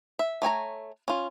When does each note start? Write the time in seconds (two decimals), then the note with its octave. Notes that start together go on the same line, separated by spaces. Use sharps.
0.19 E5
0.42 A3 C#5 G#5 A#5
1.08 C#4 F4